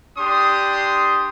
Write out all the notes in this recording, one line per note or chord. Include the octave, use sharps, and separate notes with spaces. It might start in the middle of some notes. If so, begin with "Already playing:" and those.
D4 G4 C6 D#6